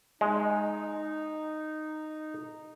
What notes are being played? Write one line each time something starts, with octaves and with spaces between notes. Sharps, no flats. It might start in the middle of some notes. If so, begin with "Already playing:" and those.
G#3 D#4